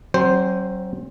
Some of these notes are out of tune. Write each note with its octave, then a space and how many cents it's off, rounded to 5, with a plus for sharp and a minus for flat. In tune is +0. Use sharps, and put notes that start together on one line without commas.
F#3 +30 C4 +40 C5 +0